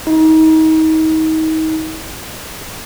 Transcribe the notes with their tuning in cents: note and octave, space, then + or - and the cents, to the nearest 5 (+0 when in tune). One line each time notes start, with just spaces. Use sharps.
D#4 +30